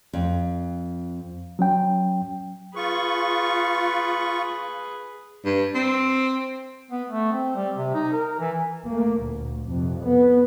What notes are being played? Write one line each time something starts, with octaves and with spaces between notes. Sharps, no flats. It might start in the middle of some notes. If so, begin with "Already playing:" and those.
F2
F#3 C#4 G5
F4 G#4 B4 C#6
G2
C4
B3
A3
C4
G3
C3
D#4
A#4
E3
A3 A#3
D2 A#2
F2 C3
B3